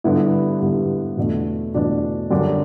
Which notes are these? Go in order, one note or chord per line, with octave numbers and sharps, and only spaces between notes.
G2 D3 G3 B3 E4
G2 D3 G3 B3 E4
E2 B2 A3 D4 F#4
E2 B2 A3 D4 F#4
F#2 D3 G3 D4 G4